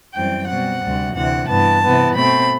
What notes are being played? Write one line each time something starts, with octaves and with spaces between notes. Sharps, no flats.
F#2 E3 G3 C4 G5
B2 G3 C4 F#5
D2 C3 G3
D2 C3 E3 F#5
G2 E3 B3 A5
C3 E3 B3
B2 A3 C4 B5